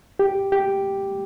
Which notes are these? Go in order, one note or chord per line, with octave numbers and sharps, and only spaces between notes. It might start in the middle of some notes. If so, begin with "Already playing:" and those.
G4
G4